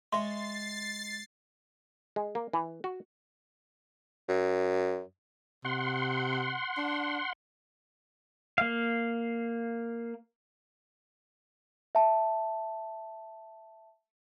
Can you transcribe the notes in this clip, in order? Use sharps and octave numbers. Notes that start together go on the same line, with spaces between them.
G#3 C#5 E5 C6 A6 C7
G#3
A#3
E3
F#4
F#2
C3 F#5 C6
D4
A#3 F5
E5 A5